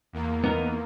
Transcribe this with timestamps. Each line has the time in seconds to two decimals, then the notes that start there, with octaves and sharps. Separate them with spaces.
0.13 E2 A#3
0.44 B3 D#4 A#4